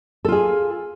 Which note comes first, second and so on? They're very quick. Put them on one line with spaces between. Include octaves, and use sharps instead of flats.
A4 F4 G#4